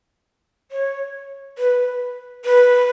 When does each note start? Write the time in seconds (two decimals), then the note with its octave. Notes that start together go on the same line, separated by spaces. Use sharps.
0.72 C#5
1.58 B4
2.45 B4